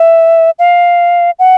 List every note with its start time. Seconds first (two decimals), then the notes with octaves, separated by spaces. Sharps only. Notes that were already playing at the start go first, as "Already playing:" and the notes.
Already playing: E5
0.59 F5
1.39 F#5